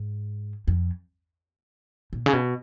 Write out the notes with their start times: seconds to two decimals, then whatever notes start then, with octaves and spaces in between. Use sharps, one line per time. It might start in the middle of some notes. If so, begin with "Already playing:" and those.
Already playing: G#2
0.68 F2
2.13 A#2
2.26 C#3
2.33 B2